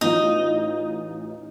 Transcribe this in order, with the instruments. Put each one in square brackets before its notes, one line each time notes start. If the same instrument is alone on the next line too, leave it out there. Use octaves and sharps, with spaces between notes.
[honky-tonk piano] A1 E3 F4 [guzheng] D#4